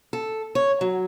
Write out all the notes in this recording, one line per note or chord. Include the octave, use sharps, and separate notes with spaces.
A4
C#5
F#3